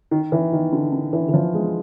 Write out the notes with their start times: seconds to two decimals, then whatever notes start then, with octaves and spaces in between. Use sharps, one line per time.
0.11 D#3
0.32 E3
0.53 D#3
0.73 D3
0.93 D3
1.13 E3
1.29 E3
1.34 F3
1.54 G#3